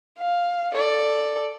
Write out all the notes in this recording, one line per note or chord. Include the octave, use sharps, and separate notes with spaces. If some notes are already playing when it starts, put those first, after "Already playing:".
F5
A4 D5